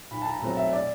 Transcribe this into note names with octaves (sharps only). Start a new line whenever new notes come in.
B1 B5
A5
A#5
B2 F#3 A3 C4 A#5
E5
D5